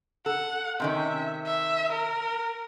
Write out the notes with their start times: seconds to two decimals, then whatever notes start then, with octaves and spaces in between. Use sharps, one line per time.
0.26 A4 F#5
0.80 C3 D#3 C#4 E5
1.46 E5
1.92 A#4